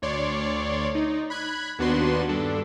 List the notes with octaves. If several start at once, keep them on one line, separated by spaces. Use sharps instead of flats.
D2 C#5 D5 C6
D#4
B5 F#6 G#6
D#2 B3 D4 F#4 B4 C6
G2 D4 A4